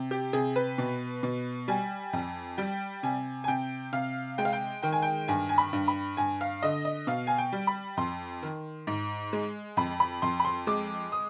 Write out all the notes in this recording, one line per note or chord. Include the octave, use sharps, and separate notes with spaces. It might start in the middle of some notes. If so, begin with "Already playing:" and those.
Already playing: C3
G4
C3 G#4
B4
B2
B2
G3 G#5
F2
G3 G5
C3 G#5
G#5
C3 G5
C3 F5
G#3 G5
F5
G5
D#3 G5
G#5
G5
G2 G#5
G#5
B5
G2
B5
G2 G#5
F5
D3 D#5
D#5
B2 F5
G#5
G5
G3
B5
F2 C6
D#3
G#2
G#3
F2 B5
B5
F2 C6
B5
C6
G#3 D6
D#6